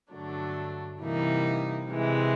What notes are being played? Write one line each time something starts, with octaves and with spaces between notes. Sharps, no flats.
G2 D3 F#3 A3 D4
C3 E3 G3 A#3 D#4
C3 E3 G#3